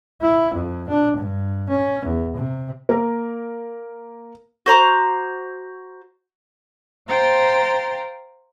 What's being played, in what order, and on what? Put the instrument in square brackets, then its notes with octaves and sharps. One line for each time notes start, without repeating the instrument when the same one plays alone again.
[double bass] E4
F2
D4
G2
C#4
E2
C3
[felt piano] A#3 A#4
[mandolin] F#4 C5 A#5 D6
[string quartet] C5 F5 G5 A#5 C6 A6